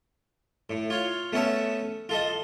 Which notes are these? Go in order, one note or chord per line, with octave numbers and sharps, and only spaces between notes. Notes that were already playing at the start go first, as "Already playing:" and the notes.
A2
F4 C#5
A3 B3 C#4 E5 A5
F4 A4 D#5